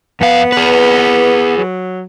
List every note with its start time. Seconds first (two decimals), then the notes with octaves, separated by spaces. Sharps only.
0.21 F2 B3 F5
0.52 G#4 B4
1.58 F#3